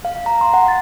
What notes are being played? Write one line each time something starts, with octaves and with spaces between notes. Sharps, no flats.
F5
A#5
C6
F#5
A6